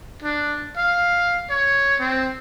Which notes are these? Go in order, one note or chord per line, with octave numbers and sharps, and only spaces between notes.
D4
F5
C#5
C4